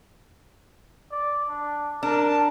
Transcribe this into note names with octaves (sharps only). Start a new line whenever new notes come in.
D5
D4
D4 A#4 A5